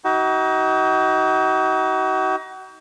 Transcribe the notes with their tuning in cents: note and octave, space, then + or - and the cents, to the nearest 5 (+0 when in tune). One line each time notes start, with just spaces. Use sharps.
D#4 +30 F#4 +35